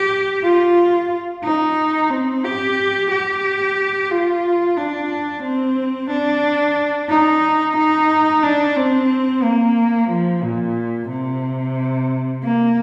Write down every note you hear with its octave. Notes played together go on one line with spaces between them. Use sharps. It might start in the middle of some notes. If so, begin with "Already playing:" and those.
Already playing: G4
F4
D#4
C4
G4
G4
F4
D4
C4
D4
D#4
D#4
D4
C4
A#3
F3
A#2
C3
A#3